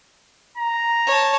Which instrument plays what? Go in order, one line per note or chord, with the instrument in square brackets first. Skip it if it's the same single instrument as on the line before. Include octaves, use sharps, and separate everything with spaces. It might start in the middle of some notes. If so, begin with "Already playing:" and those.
[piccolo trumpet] A#5
[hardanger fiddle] C#5 A5